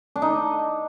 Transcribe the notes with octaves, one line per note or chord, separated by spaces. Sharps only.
D4
D#4